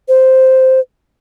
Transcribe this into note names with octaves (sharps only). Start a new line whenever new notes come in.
C5